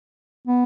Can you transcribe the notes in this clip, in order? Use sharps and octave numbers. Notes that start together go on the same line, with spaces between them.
B3